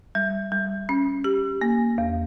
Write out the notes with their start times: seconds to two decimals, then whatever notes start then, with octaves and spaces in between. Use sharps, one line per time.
0.15 G3
0.52 G3
0.89 C#4
1.24 G4
1.61 A#3
1.98 E2